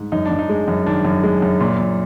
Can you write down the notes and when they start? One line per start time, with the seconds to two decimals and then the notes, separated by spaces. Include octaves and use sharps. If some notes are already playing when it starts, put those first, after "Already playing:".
Already playing: G#2
0.12 F#2 D#4
0.25 D4
0.31 F#2
0.39 D#4
0.49 G#3
0.68 F#2
0.86 D#3 D4
1.05 F#2
1.24 G#3
1.42 F#2
1.60 A#2
1.79 A#2